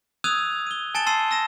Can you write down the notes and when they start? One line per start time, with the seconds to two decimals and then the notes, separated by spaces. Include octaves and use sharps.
0.24 D#6 E6 F#6 G#6 D#7 F7
0.67 D#7 G7
0.95 G#5 A5 A6 C#7 E7 G7
1.07 A5 C6 E6 A6 C7 D#7
1.31 E6 A#6 E7